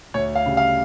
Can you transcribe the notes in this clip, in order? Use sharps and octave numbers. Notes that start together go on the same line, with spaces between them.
D2 C#5
F5
C#3 G3
F5